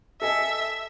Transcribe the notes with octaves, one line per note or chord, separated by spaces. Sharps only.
A4 D#5 E5 G#5